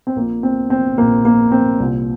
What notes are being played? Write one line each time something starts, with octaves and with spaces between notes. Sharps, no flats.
C4
A#1 A#2 A#3
C4
C4
A#1 A#2 A#3
A#3
C4
C2 A#2